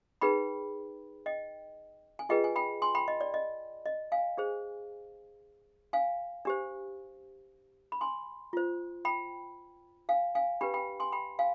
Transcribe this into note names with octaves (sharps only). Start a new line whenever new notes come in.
D#4 G#4 B4 G5 B5
D#5 G5
G#5
F4 G#4 B4 D#5 G5
G#5
G5 B5
G#5 C6
G5 B5
D#5
D5
D#5
D#5
F5 G#5
D4 G#4 C5
F5 G#5
D4 G4 C5
B5
G#5 C6
F4 C5
G5 B5
F5 G#5
F5 G#5
D4 G4 B4 G5 B5
G5 B5
G#5 C6
G5 B5
F5 G#5